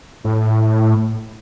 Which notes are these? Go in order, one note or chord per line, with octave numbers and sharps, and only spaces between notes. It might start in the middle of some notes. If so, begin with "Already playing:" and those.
A2